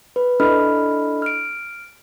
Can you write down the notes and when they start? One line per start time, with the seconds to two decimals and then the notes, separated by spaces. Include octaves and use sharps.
0.16 B4
0.40 D4 E4 A4 D#5 B5 F6
1.22 F6 D7